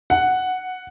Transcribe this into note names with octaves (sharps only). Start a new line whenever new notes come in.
F#5